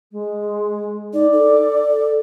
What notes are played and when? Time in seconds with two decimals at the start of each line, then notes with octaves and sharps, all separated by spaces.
0.12 G#3
1.13 D#4 D5
1.33 A4